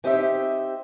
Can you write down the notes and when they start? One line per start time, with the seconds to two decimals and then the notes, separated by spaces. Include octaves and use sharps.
0.04 C4 D#4 G4 C5 D#5 E5